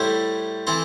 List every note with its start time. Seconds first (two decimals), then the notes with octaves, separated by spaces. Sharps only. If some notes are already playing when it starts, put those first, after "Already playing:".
Already playing: A2 G3 E4 C5
0.67 E3 C4 A4 C5